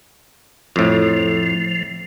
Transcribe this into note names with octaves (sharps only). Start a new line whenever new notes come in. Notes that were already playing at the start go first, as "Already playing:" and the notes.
F2 A2 F3